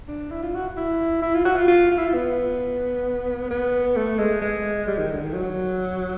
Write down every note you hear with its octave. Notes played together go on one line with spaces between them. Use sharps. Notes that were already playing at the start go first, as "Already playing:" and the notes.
D4
E4
F4
F#4
E4
E4
F4
F#4
F4
F4
F4
E4
F4
B3
B3
A3
G#3
G#3
G3
D#3
D3
D#3
F#3